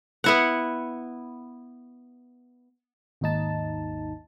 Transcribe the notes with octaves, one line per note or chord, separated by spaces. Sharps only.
B3 E4 F#5
G#1 D#2 D#4 A5